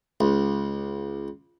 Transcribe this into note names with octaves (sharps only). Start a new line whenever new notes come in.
C#2